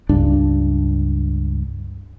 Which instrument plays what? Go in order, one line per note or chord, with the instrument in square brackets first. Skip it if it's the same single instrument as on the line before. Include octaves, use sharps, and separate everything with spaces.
[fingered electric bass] C#2 G2 D4